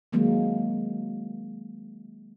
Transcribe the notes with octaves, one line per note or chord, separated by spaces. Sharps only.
D#3 F#3 G#3 A#3 C4